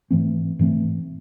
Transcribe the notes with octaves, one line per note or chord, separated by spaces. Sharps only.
G#2 E3 A3 C4
G#2 E3 A3 C4